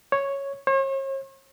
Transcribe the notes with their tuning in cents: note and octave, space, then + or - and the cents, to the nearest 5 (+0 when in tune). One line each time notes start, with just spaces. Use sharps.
C#5 -5
C#5 -45